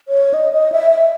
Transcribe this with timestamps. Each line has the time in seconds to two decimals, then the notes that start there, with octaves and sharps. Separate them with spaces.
0.08 C#5
0.34 D#5
0.53 D#5
0.72 E5
0.91 E5